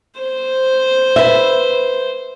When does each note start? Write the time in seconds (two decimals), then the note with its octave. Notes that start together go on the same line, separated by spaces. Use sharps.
0.20 C5
1.16 B4 E5